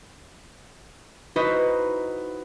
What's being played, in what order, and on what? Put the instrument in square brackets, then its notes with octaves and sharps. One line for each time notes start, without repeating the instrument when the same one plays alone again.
[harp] D#4 E4 F#4 B4 C5 D#5